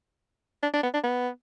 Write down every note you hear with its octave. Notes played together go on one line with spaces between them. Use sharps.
D4
D4
B3
D4
B3